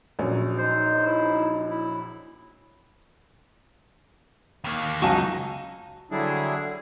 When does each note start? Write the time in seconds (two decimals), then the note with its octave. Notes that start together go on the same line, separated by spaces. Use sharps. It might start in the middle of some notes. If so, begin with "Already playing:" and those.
0.19 A#1 F#3 C#4
0.58 D#4 C5
1.06 E4
1.70 E4
4.64 D#2 A#3
5.02 C#2 F#3 D#4 G#5 A5 C#6
6.11 D3 F#3 G3 D4 E4 G#4